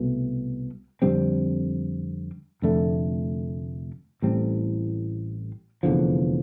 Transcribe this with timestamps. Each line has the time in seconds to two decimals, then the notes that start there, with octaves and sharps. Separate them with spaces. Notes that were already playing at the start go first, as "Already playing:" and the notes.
Already playing: C2 B2 A3
1.02 F2 D3 G3 C4
2.62 F1 F2 D3 A3
4.22 A1 A2 G3 C4
5.83 F1 E2 D3 F3